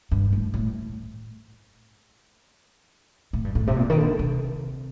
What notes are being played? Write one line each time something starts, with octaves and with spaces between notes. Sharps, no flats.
G2
A2
A2
A2
G2
A2
C3
A#2
D#3
D3
C3